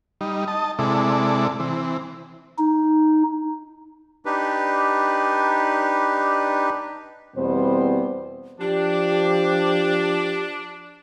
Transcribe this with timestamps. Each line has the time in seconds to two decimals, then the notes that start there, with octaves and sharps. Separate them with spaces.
0.21 G3 D#4
0.48 D#5 A5
0.79 C3 G#3 E4 A4 D5
1.60 E3 C4
2.58 D#4
4.25 D4 D#4 G4 B4
7.35 E2 B2 G3 B3 C4 C5
8.60 F3 D4 G4